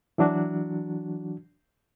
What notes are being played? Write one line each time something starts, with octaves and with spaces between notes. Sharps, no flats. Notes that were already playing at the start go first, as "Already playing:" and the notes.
E3 F#3 D4 F#4